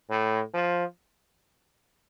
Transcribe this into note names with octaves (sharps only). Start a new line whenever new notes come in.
A2
F3